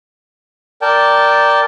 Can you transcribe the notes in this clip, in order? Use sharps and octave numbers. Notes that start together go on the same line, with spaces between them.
A#4 D5 G5 A5